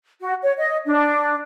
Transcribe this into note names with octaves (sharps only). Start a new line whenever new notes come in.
F#4
C#5
D#5
D4